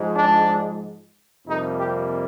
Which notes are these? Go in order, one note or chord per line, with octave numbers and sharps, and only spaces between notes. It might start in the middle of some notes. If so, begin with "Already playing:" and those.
Already playing: G#2 F3 G#3
D4
F2 C3 G3 A#3 D#4
G4